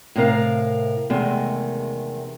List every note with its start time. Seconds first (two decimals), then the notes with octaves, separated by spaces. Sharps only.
0.16 A2 C3 A#4 F5
1.10 E2 C3 D#3 G#3 A3